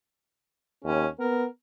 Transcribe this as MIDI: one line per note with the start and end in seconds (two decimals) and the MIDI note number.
0.84 1.07 39
0.84 1.07 61
1.19 1.46 59
1.19 1.45 70